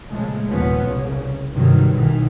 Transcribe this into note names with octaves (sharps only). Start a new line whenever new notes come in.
A#2 C#3 F3 G#3 A3
F1 D#2 A#2 F3 B3 C#4
C2 C#3
G2 C3 D#3 E3 F#3 G3
B1 B2 D#3 E3